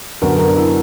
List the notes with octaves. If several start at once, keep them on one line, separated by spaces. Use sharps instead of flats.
F#2 D3 F#3 B3 A#4
A#4
D4
E4